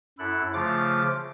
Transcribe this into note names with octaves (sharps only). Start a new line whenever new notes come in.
F#2 E4 A4 F#6
C#3 F3 A3 F4 D6